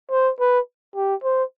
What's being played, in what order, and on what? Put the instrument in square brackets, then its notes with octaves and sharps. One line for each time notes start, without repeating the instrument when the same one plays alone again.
[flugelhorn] C5
B4
G4
C5